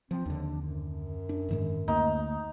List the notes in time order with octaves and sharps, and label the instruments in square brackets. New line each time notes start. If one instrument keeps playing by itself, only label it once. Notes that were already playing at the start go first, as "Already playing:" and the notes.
[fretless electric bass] F3 [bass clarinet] C4
[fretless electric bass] D#2 D3 [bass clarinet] D4
[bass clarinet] F#2
[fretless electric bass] D4
G#2 D#3 G#3
[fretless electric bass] D2 A#3 [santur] D#4